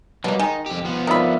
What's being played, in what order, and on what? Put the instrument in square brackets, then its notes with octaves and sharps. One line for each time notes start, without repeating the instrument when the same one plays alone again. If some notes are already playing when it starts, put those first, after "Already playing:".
[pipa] B2 A#3 [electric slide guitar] F#3 G3
[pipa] D#3 G#3 [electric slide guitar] D#4 [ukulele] G#5 A#5
[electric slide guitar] F2 G4
F3 B3
[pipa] C3 B5 [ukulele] D#4 F4 [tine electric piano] A#4 D5 E5